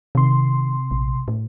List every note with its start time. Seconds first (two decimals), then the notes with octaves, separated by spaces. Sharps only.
0.15 C3 D#3 C6
0.91 A#1
1.28 A2